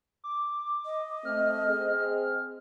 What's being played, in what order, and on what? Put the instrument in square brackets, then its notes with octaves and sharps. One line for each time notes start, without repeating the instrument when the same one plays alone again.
[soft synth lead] D6
[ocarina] D#5
[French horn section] A3 C4 [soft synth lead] F6
[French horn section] C4 G#4